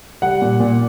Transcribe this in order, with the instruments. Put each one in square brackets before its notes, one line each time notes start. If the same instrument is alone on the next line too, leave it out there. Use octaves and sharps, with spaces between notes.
[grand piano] G3 F#5
A#2
A#2